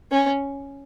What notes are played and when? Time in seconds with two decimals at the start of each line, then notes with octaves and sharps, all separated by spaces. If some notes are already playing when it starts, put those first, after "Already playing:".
0.11 C#4